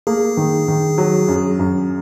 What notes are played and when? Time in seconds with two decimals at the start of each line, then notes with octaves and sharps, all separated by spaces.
0.07 A#3 G#4
0.37 D#3
0.68 D#3
0.98 F#3
1.28 F#2
1.59 F#2